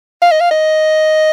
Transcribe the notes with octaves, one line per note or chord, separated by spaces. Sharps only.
F5
D#5
F5
D#5